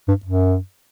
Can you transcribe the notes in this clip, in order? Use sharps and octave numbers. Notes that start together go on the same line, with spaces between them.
G2
F#2